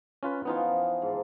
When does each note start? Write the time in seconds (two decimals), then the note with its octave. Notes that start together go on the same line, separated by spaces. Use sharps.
0.23 C#4 F4 B4
0.45 E3 F3 B3 D#4 F4
1.02 G#2 A5